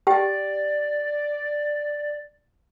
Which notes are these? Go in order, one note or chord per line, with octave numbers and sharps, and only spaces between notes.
G4 D5 G5